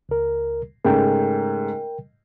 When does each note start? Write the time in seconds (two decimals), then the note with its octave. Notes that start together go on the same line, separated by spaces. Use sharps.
0.09 C#2 A#4
0.85 G#2 C#3 A3 A#4 G5